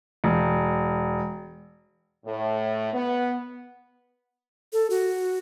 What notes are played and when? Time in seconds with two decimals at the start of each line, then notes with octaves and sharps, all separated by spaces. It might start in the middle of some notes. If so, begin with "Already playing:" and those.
0.24 E1
2.26 A2
2.94 B3
4.73 A4
4.90 F#4